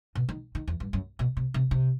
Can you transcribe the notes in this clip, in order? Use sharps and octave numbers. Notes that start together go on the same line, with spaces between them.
B2
D#3
D#3
E2
G2
F#2
B2
C3
C3
C3